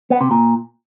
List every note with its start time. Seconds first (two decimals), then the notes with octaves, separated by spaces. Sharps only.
0.10 B3
0.21 C3
0.31 A#2